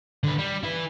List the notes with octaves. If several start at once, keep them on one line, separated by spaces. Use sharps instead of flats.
D3 B4
G3
E4 B4